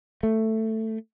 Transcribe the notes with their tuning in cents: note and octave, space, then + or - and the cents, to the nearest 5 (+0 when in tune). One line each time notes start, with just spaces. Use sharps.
A3 +10